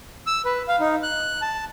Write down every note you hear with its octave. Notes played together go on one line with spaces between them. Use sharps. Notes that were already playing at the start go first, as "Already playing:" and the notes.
E6
B4
F5
D#4
F#6
A5